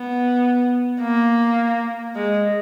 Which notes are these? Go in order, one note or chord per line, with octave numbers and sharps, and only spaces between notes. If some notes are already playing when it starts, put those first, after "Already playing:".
Already playing: B3
A#3
G#3